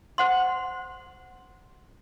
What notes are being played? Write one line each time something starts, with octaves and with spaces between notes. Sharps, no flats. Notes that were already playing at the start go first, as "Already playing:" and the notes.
C5 F#5 C6